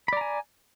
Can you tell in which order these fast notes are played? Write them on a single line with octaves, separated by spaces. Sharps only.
B5 D5 A#5 G#5